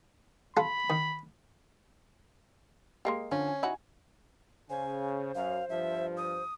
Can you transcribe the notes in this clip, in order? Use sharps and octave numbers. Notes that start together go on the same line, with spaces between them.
F4 A4 B5
D#3
G#3 A#3 G4 D#5 C7
D3 F3 C#4
G#5
D#4 E4 F#4 G#5
C#3 C5 G#5
F#2 F5
G2 F3 E5
D#6